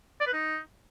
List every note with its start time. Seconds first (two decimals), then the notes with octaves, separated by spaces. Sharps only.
0.20 D5
0.27 B4
0.33 D#4